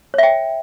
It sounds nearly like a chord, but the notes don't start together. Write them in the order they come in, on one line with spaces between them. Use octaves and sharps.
C#5 E5 G5